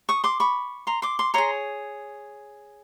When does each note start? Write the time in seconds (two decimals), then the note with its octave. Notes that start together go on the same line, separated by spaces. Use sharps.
0.09 C#6 D#6
0.24 C6 D6
0.40 B5 C#6
0.87 A#5 C6
1.02 C6 D6
1.19 C6 D6
1.34 G#4 C#5 A#5 C6